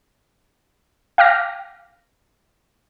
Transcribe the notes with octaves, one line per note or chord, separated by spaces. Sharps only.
F5 G5 D6 F6 A#6